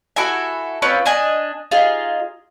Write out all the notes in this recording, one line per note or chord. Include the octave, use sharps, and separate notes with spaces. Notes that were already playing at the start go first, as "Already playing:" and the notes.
E4 F#4 A4 G#5
C4 C#4 F4 B4
D4 D#5 G#5
D#4 F4 G#4